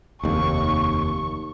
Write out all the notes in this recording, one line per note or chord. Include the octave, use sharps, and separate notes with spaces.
F1 D#2 C#6